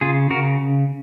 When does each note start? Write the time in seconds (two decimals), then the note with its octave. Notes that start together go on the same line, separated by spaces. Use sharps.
0.01 C#3 F4 G#4
0.30 C#3 F#4 A#4